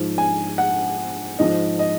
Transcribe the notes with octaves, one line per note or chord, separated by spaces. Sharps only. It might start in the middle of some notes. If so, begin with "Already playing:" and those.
Already playing: G#2 F3
G#5
F#5
G#2 F3 D#5
D#5